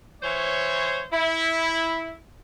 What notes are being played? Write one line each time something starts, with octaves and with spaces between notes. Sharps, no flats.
E3 C5 C#5
E4